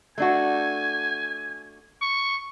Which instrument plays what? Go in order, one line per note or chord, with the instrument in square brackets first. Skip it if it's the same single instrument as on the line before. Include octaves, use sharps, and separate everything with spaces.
[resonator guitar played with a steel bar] A3 D4 F#4 [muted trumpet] G#5
[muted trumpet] C#6